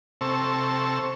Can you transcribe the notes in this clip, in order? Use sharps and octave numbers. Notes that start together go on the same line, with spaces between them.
C3 C4 A4 C#6 E6